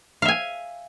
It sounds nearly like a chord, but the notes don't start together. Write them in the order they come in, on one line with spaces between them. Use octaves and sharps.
F5 E5 G#5